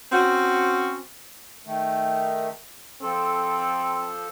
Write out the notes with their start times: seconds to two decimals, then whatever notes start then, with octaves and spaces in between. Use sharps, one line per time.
0.12 C4 C#4 F#4
1.65 D#3 A3
3.02 F3 C4 A4